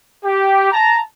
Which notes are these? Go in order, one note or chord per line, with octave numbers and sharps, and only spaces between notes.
G4
A5 A#5